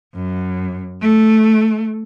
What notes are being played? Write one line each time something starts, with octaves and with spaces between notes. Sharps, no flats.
F#2
A3